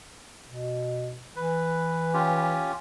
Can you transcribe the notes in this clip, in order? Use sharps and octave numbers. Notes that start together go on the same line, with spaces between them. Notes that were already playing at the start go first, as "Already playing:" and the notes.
B2
E3 B4
C#4 F4 G4